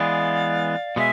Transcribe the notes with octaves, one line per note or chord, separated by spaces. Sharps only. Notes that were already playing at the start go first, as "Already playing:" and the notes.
Already playing: E3 G#3 B3 D5 F5
B2 G#3 E5 G#5